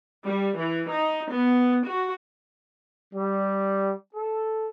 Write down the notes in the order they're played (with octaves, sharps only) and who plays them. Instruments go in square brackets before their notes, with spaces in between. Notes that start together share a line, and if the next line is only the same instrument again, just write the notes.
[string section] G3
E3
D#4
B3
F#4
[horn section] G3
A4